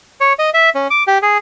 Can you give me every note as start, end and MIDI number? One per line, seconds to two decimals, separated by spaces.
0.20 0.33 73
0.39 0.50 75
0.54 0.70 76
0.75 0.88 61
0.90 1.03 86
1.07 1.18 67
1.22 1.38 68